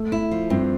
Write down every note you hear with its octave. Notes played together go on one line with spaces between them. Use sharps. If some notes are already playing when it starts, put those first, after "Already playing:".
Already playing: A3
E4
F3
G2 C4